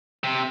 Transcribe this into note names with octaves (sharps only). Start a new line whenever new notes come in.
C3